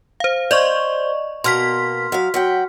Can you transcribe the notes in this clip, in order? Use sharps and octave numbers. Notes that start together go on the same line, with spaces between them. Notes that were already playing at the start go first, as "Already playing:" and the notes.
C5 F5
C5 D5 D#5 C#6
B2 A#3 C6 F6 B6
F#3 F5
F#3 F#5 G5